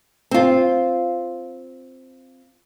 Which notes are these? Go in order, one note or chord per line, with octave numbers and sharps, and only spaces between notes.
C4 F4